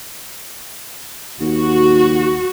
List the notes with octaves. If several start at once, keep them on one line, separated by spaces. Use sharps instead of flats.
D#2 F#4